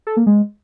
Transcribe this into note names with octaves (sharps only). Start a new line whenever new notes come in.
A4
A#3
G#3